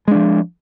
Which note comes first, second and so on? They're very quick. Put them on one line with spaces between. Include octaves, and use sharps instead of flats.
G#3 D4 F3